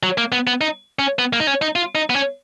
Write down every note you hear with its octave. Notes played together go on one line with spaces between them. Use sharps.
F#3
A#3
B3
B3
D#4
C#4
B3
A#3
D#4
C#4
D#4
F4
D#4
B3
C#4